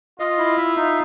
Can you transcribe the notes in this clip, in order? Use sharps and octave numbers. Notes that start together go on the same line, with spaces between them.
F4 D#5
E4
E5
D#4